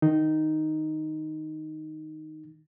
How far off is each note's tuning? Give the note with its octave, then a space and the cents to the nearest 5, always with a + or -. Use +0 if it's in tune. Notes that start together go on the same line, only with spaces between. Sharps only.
D#3 +0 D#4 +0